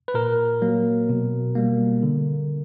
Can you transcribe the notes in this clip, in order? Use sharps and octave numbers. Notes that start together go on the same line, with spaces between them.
B4
A#2 A#4
F#3 A#3
B2
G3 A#3
D3